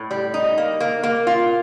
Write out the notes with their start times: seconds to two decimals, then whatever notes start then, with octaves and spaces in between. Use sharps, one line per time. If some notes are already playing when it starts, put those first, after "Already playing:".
Already playing: A2
0.11 G3
0.34 D#4
0.58 A#3
0.80 A#3
1.03 A#3
1.27 F4